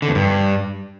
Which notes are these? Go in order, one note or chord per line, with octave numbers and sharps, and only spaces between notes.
D3
E2
G2